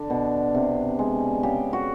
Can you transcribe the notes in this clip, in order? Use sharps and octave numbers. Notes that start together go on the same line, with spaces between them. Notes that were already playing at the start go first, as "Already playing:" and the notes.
Already playing: D3 D4
B2
C3
G#3
C#3 G4
F#4